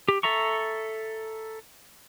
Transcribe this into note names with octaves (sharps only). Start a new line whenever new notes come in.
G4
A4 E5 A#5 C#6